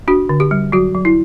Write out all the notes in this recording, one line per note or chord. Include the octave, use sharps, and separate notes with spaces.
D4 F#4
D3
G4
G3
F#3 F#4
F#3
E4